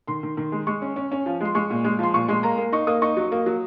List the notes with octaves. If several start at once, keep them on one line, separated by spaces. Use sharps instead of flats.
D#3 C6
D#3
D#3
G#3
G#3 C#6
C#4
C#4
C#4
F3
G#3 C6
G#3 C#6
A#2
G#3
F3 C6
A#2 C#6
G#3 C6
A#3 A#5
A#3
D#4 C#6
A#3 D#6
D#4 C#6
F#3
A#3
F#3